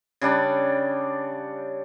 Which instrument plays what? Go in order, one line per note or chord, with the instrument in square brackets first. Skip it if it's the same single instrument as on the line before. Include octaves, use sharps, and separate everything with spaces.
[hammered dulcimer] C#3 G3 D4 D5